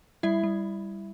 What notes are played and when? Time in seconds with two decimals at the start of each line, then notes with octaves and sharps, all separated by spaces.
0.23 G3 E4 E5
0.43 G3